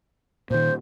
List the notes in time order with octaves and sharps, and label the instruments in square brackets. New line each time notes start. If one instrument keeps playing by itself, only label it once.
[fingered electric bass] A#2 D#3 [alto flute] C5